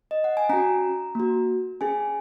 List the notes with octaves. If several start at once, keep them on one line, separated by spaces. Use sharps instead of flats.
D#5
F#5
G#5
C#4 F#4 A#5
A#3 F#4
C#4 G#4 G#5